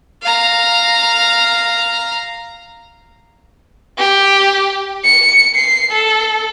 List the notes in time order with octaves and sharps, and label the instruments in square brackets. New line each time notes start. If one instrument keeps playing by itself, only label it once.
[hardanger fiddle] F5 A#5
[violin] G4
C#7
C7
A4